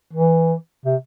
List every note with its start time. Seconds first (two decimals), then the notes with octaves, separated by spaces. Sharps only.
0.13 E3
0.85 C3